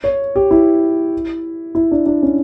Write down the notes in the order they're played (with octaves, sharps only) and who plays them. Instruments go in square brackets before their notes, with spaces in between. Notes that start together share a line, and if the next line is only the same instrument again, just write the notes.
[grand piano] C#5
G4
E4
E4
D4
D4
C#4